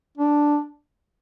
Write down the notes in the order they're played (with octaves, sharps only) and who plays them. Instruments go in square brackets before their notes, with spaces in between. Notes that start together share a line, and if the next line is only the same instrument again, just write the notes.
[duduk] D4